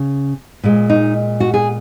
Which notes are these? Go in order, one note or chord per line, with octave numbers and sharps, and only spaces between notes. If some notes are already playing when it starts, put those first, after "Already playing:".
Already playing: C#3
A#2 G#3
D#4
F#4
G#4